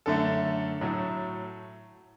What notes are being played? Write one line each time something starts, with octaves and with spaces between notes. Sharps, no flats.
F#2 D3 A3 A4
A2 F#3 A3